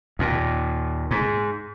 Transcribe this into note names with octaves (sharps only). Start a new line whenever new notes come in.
D#2 A#2
G#2